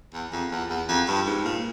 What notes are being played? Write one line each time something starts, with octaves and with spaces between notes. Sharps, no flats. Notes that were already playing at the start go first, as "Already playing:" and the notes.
E2
F2
E2
E2
F2
G2
G#2
A#2